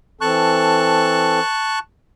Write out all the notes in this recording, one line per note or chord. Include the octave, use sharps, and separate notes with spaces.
E3 C4 A4 A5 C#6 F#6